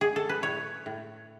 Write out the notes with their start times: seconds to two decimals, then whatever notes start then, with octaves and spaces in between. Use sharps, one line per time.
0.01 G#4
0.16 A4
0.29 B4
0.42 A2 C#5
0.86 A2